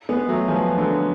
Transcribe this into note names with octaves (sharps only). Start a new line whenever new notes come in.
G#3 B3
F#3 A3
F3 G#3
D3 F#3